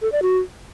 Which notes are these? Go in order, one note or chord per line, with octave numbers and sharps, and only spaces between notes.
A4
D5
F#4